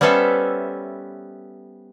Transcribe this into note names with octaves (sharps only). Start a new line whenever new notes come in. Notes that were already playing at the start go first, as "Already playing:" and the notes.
G3 B3 C#4 A4 C5 E5